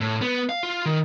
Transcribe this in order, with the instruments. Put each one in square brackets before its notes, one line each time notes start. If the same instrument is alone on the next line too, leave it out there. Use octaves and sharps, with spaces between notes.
[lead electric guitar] A2
B3
F5
F4
D#3